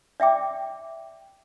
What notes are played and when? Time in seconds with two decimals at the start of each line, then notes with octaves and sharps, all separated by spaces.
0.20 D5 E5 G5 D6